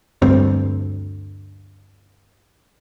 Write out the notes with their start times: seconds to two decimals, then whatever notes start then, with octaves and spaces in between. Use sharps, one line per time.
0.22 D2 G2 C4